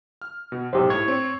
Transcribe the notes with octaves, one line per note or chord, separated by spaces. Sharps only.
F6
B2
B1 G#2 G4 C5
A2 C#6 G#6
C4 C5 C#5